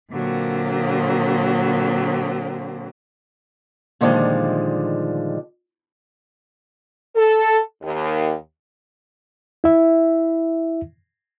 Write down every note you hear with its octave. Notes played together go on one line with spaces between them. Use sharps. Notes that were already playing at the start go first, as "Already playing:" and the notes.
A#2 D3 F#3 A#3 C4
A#2 D3 D#3 F3 G3 G#3
A4
D#2
E4 E5